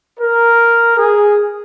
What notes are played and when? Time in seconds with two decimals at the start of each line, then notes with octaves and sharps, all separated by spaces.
0.19 A#4
0.98 G#4